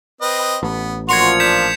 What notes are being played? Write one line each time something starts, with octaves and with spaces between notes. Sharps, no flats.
C4 B4 D#5
A1 B3
A#2 F3 F#4 C6 G#6 C#7 F7
D4 G6 B6 E7